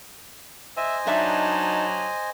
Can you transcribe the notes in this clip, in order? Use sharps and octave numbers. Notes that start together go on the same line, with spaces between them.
C5 D#5 E5 G#5
F#3 D4 D#4 D5 E5 A5